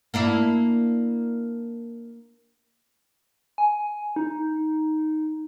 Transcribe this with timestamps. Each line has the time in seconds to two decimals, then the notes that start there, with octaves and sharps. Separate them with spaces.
0.14 A#3 D4 E4
3.58 G#5
4.16 D#4